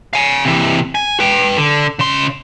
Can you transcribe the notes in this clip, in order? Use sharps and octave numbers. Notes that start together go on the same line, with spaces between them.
F5 G#5
C3 E3
G#5
B4 G5
D3
C#3 C6